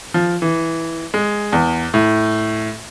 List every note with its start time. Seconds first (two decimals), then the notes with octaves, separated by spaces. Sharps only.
0.14 F3
0.42 E3
1.14 G#3
1.53 E2
1.94 A2